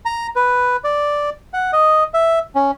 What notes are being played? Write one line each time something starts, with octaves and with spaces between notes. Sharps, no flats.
A#5
B4
D5
F#5
D#5
E5
C#4